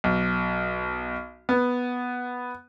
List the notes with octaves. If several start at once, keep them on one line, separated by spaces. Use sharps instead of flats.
B1
B3